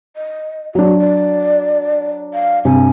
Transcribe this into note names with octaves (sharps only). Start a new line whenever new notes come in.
D#5
F#3 D4 F#4
D5
F5
G2 C3 G#5